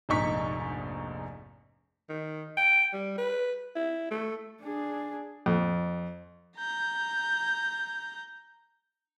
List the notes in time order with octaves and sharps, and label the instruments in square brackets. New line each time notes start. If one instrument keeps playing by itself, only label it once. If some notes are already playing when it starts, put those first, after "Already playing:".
[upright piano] F1 A#1 G#2 D#4 C#6 B6
[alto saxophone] D#3
G5
G3
B4
E4
A3
[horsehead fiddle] D4 G#4
[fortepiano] F2
[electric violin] A#5 G6